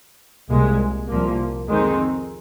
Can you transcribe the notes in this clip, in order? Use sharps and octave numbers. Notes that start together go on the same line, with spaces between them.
C2 A#2 G#3
C2 A#2 F3 A#3
F2 D#3 G#3 C4 D#4